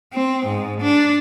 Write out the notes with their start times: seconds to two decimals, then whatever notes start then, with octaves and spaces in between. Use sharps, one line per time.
0.14 C4
0.46 G#2
0.81 D4